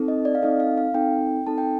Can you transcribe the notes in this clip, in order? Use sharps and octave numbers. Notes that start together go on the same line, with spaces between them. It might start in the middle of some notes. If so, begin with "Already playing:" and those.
Already playing: C4 D#4 A4
D#5
D5
F5
C4 D#4 A4 D#5
F5
F5
C4 D#4 A4 G5
C4 D#4 A4 A5
G5